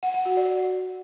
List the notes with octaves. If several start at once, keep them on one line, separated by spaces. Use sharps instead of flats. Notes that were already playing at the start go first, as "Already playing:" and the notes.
F#5
F#5
F#4
D5